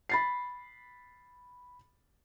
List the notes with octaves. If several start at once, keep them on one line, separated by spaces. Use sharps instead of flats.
B5 A6 C7